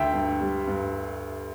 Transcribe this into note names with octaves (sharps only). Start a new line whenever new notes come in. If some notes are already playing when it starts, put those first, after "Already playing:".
Already playing: D2 E5 G5
G2
G3
G2